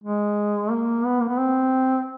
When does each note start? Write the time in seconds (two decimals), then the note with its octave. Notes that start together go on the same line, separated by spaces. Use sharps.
0.04 G#3
0.71 A#3
1.05 B3
1.20 A#3
1.29 B3
1.38 C4